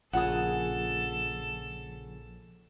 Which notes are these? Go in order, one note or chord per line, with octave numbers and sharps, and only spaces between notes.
A#1 C#3 F4 G#4 A4 F#5 A5 D#6